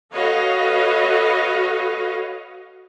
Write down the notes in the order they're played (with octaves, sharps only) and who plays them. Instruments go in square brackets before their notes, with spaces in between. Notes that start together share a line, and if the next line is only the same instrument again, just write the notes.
[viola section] F#4 A4 B4 C#5 D#5 F5